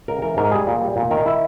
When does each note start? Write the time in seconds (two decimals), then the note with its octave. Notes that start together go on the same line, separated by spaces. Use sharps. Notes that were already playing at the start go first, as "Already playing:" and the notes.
0.08 C#2 A#4
0.22 E3 A#4
0.37 G#2 A#4
0.52 G3 G#4
0.67 A#2
0.81 G3
0.96 A#2
1.11 D#3 A#4
1.26 E4